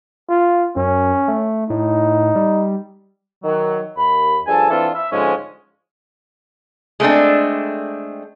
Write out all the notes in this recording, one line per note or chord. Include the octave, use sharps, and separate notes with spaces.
F4
F#2 C#4
A3
A2 D#4
G3
D#3 F#3
D#2 B5
G2 F3 G#4 A4 G#5 A5
E3 C4 D4 F4 A4
E5
G#2 D3 F3 G#3 C#4 F4
G#3 A3 C4 D4